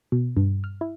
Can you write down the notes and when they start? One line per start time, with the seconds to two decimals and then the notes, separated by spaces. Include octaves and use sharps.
0.12 B2
0.37 G2
0.64 F6
0.81 E4